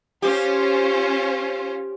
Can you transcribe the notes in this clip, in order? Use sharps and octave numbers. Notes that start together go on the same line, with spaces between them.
C#4 F4 G4 C5